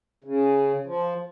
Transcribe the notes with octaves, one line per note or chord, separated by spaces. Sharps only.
C#3
F3